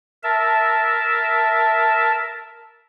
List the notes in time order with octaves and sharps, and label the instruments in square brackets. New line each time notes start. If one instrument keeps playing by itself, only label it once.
[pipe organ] A#4 E5 A5